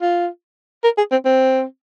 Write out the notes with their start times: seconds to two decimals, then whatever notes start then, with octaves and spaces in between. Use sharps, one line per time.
0.02 F4
0.84 A#4
0.98 G#4
1.12 C4
1.25 C4